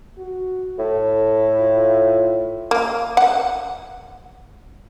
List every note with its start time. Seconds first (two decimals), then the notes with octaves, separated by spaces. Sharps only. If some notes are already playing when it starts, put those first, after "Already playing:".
0.18 F#4
0.79 A2 A4
1.60 F4
2.71 A#3
3.17 F#5